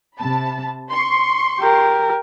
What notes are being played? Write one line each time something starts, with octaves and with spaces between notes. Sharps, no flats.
C3 A5 B5
C6 C#6
G4 A#4